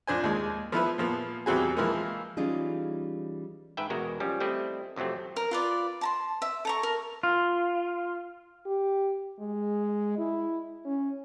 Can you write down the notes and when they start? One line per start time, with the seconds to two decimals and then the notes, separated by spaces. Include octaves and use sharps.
0.07 F2 D4 C5 G#5
0.24 D#2 G#3
0.72 F3 B3 E4 B4
0.98 A#2 F3 B3
1.46 E2 G3 C4 F#4 G#4
1.77 E3 F3 G#3 A#3
2.37 E3 G3 C#4 D#4 F4 G#4
3.77 G#2 B4 E5 G5
3.90 E2 B2 G#3 F#4 A#4
4.20 F3 G3 C#4
4.40 G3 A3 C4 E4 D#5
4.96 F2 C3 F#3 A3 C4
5.36 A#4
5.51 F4 B4 D5
6.01 A5 A#5 C6
6.42 E5
6.65 A4 A#5 C#6
6.83 A#4
7.23 F4
8.66 G4
9.39 G#3
10.18 E4
10.85 C#4